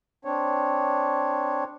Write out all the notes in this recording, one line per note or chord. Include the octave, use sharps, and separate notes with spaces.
C4 D4 C#5